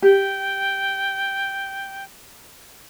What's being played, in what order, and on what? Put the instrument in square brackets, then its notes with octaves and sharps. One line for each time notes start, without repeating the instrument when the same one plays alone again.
[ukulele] G4 [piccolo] G5